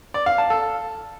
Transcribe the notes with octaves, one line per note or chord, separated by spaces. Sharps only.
D5
F5
A5
A4